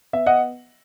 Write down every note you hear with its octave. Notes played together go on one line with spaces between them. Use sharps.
B3 E5
D#5 F#5